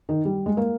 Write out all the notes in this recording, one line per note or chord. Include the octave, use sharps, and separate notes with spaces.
D#3
G3
G#3
A#3